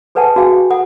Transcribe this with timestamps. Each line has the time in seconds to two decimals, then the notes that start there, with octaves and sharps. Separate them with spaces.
0.15 G#4 A4 B4 F#5 G#5 A5
0.36 F#4 G#4 F5 G5 G#5
0.70 A4 F#5 D#6